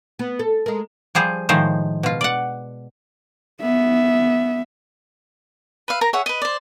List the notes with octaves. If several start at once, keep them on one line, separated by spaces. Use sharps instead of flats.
B3
A4
G#3 A#4
F3 G3 G#4 C5
A2 D#3 F3 G#3 C5
B2 F4
D5 F#5
B3 E5
B4 E5 F5
A#4 A#5
G#4 C#5 E5 F#5
B4 D#5
C5 D5